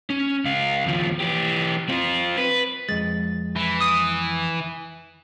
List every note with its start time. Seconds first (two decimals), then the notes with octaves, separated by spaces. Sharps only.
0.10 C#4
0.45 C#2 F5
0.86 D#2 F3
1.20 E3 G4
1.89 C4 F4
2.38 B4
2.89 F2 G#3 A6
3.56 E3
3.81 D#6 D#7